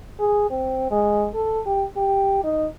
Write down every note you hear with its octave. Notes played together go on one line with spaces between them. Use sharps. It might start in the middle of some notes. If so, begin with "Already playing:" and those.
G#4
C4
G#3
A4
G4
G4
D#4